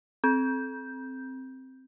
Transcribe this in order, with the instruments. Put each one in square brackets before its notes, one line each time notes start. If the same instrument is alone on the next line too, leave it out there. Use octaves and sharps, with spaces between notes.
[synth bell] C4 G6